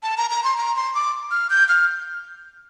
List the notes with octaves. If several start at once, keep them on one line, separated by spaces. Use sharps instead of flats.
A5
A#5
A#5
C6
A#5
C6
D6
F6
G6
F6